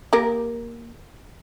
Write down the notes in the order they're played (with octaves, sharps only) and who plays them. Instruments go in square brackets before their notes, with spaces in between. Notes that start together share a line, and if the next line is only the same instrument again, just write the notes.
[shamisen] A#3 G4 A#4